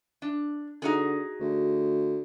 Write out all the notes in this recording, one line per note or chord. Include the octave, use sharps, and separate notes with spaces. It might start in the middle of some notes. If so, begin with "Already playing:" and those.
D4
D3 D#4 F#4 G#4
D2